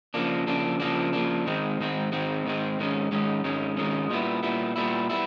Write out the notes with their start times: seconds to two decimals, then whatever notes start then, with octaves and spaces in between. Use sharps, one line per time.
0.14 C#3 F3 A#3 D4
0.47 C#3 F3 A#3 D4
0.80 C#3 F3 A#3 D4
1.13 C#3 F3 A#3 D4
1.46 G#2 D#3 G#3 C4
1.79 G#2 D#3 G#3 C4
2.12 G#2 D#3 G#3 C4
2.45 G#2 D#3 G#3 C4
2.79 G#2 D#3 G#3 C#4
3.12 G#2 D#3 G#3 C#4
3.44 G#2 D#3 G#3 C#4
3.77 G#2 D#3 G#3 C#4
4.10 A#2 G3 B3 E4
4.43 A#2 G3 B3 E4
4.76 A#2 G3 B3 E4
5.10 G3 B3 E4